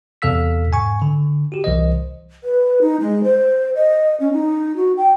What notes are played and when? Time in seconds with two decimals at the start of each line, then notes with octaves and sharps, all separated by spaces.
0.22 E2 C3 A4 F5 E6 B6
0.72 G#2 G#5 C#6
1.02 D3
1.52 F#4 G4
1.64 C2 E3 C5 D#5
2.44 B4
2.81 D#4
3.00 G#3
3.24 C5
3.75 D#5
4.20 C#4
4.33 D#4
4.76 F#4
4.97 G5